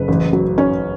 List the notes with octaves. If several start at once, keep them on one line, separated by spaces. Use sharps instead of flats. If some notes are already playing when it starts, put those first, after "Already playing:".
Already playing: F#1 B4
A1
F#3
C#4